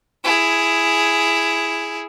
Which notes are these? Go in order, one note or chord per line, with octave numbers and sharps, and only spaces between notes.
E4 G#4